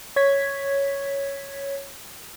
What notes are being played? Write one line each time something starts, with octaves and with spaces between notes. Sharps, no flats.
C#5 G#6 B6